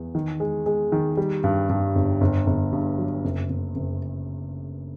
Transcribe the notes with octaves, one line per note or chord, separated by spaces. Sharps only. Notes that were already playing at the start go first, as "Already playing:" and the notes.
Already playing: E2
D#3
G#3
G#3
D#3
G3
G2
G2
G1
G1
G1
G2
F#3
F#1
F#1
F#1